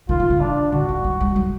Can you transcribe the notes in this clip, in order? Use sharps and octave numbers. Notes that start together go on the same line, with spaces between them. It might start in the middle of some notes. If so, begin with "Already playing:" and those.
D#3 F4
D#3
D3
D4
D3 F#4
F3
F#3
G#3
F#3